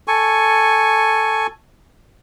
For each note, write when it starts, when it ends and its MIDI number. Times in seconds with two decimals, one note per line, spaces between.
0.08 1.47 69
0.08 1.47 80
0.08 1.47 85